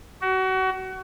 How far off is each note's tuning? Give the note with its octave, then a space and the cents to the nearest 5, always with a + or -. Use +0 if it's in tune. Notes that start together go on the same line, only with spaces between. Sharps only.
F#4 +30